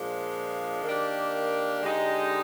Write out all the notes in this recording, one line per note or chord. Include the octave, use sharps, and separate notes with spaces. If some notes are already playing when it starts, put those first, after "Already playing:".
Already playing: A#2 F3 G#3 D4
D#3 A#3 D4 G4
D3 G#3 D#4 G4